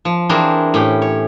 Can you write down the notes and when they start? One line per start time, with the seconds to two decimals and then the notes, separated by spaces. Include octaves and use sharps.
0.05 F3
0.29 E3 C4 D4 G#4 A#4
0.74 A2 C#4 G4
1.02 C#5